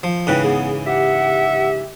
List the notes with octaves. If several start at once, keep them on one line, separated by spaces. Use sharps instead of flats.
F3
G#2 C#3 E3 B4 G5
B3 G#4
G4 E5 F#5